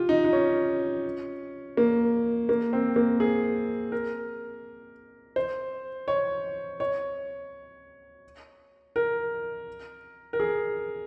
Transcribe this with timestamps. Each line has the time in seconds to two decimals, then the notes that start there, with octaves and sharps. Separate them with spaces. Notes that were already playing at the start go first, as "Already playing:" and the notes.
Already playing: F4 G4
0.09 D#4
0.24 D#4
0.33 C#4
1.77 A#3
2.49 A#3
2.73 C4
2.96 A#3
3.20 G#4
3.92 A#4
5.36 C5
6.08 C#5
6.80 C#5
8.96 A#4
10.33 A#4
10.40 G#4